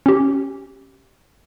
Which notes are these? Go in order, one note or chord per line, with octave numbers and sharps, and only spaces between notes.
C#4 G4